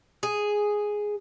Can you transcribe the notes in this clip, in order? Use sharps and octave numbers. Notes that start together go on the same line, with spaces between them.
G#4